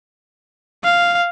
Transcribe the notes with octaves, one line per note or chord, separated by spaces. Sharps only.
F5